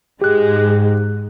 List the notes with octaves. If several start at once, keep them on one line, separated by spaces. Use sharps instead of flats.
G#2 G#3 G4 F#6